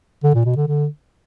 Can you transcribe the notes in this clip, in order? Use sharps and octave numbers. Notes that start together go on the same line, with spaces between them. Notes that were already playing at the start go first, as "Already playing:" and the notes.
D3
A#2
B2
D3
D3